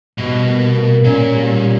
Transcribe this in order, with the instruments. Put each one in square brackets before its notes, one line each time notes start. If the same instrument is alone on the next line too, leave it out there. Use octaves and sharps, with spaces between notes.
[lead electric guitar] B2 [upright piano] G3
[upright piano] A#3
A#3
[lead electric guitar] A#2 [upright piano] C#4
[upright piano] G3
G3